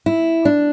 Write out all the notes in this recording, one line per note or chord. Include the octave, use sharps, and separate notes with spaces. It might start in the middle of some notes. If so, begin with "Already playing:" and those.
E4
D4